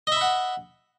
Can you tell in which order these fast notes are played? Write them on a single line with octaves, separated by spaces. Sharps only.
D#5 E5 B5 F#5